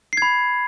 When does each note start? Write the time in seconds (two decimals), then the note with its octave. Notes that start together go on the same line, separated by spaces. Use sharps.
0.13 C7
0.17 G#6
0.22 B5